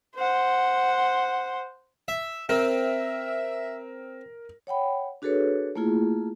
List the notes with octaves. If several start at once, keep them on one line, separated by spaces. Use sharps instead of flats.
C5 F#5
E5
C4 A#4 E5
C#5 F#5 G5 B5
D4 F#4 G#4 A4 B4 C#5
A3 A#3 E4 F4 G#4